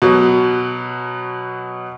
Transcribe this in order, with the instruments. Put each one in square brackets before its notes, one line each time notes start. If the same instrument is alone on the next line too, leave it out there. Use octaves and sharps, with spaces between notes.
[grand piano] B2 F#3